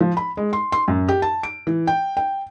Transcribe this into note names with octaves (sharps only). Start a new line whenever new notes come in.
F3
B5
G#3
C6
C6
F#2
G4
A5
D7
E3
G5
G5